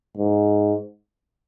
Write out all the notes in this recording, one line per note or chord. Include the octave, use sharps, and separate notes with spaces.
G#2